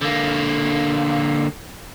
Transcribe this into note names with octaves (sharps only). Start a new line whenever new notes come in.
D3 A#3